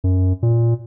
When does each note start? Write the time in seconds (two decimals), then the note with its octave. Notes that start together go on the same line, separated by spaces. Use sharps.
0.04 F#2
0.43 A#2